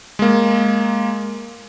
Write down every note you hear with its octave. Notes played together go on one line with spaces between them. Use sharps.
G#3 A#3